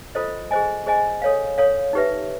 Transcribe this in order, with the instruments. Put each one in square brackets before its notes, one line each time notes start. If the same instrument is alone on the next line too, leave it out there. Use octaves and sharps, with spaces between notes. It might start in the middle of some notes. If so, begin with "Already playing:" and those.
[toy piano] F4 A4 C5 D#5
G#4 C5 D#5 G#5
G#4 C5 D#5 G#5
A4 C#5 F5
A4 C#5 F5
D#4 G4 B4 E5